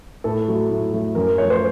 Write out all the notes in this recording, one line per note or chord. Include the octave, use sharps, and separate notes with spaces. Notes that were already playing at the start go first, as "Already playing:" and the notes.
A2 A4
F#3 A3
A2
F#3 A3
F#2 A#4
A#4
F3 A3 C#5
C5